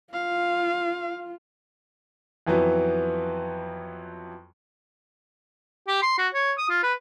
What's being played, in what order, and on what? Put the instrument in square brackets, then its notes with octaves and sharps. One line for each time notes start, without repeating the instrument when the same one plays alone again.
[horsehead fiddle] F4 [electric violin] F5
[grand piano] F2 E3 F#3 B3
[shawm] G4
C6
F#4
C#5
D#6
F4
B4